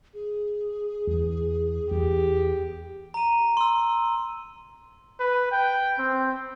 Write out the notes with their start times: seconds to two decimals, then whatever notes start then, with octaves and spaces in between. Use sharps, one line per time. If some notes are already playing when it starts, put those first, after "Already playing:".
0.14 G#4
1.07 E2
1.91 E2 G4
3.14 A#5 D#7
3.57 C6 E6
5.20 B4
5.52 G5
5.98 C4